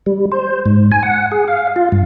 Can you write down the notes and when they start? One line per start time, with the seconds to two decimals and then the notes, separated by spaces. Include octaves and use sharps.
0.06 G3
0.32 C5
0.66 G#2
0.92 G#5
1.03 F#5
1.32 G#4
1.48 F5
1.76 F4
1.92 G2